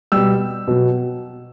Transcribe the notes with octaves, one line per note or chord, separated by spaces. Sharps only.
B2 G3 E6
B2 F#3